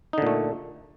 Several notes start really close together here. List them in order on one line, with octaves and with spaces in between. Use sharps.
D#4 D3 A#2 A3